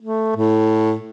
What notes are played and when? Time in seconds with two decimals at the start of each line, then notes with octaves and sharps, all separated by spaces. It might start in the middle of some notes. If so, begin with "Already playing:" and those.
0.01 A3
0.36 A2